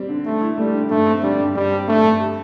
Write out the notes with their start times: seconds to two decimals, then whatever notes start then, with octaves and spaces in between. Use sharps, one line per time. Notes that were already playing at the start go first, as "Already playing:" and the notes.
Already playing: G3 C4 G4
0.09 D3
0.25 D3 A3
0.41 E4
0.58 G3 A3
0.74 D3
0.90 G2 A3
1.07 C4
1.22 D3 G3
1.39 G2
1.55 G2 G3
1.71 C4
1.88 D3 A3
2.04 G2
2.20 G4